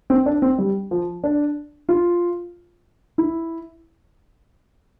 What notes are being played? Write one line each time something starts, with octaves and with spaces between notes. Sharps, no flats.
C4
D4
C4
G3
F3
D4
F4
E4